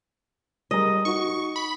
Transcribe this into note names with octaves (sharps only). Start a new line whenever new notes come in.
G3 G#4 A#4 D#5
D#4 F#4 C#6
B5